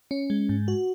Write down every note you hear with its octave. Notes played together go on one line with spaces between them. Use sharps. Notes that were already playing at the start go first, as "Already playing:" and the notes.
C#4
G#3
G#2
F#4